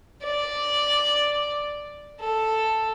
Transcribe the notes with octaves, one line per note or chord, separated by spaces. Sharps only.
D5
A4